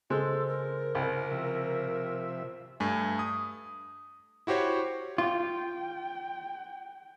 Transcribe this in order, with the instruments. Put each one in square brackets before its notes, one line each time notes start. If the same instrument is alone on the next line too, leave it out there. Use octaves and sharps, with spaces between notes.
[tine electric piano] C#3 G#4 C5 [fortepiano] G#3 [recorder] A4
[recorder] A#4
[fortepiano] C2
[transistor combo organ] C3 F3 E5
[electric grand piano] G2 A3 G#5
D#6
E4 F#4 G4 C5 C#5
[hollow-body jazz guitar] F4 [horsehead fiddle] G5